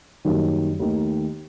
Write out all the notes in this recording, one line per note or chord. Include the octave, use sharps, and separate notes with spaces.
F#2 D#3 G3 A#3 D#4
D#2 D#3 A3